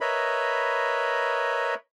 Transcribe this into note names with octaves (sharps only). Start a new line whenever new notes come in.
A#4 B4 C#5 D#5 E5 B5